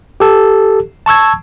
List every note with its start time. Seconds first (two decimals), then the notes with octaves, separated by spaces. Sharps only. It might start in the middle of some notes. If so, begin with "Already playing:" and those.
0.20 G4 A4
1.06 A5 C#6 E6 G#6